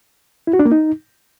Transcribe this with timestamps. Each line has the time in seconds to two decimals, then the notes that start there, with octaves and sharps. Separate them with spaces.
0.47 E4
0.53 F#4
0.59 D4
0.66 A#3
0.72 D#4